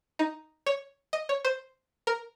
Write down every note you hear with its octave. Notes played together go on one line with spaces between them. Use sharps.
D#4
C#5
D#5
C#5
C5
A#4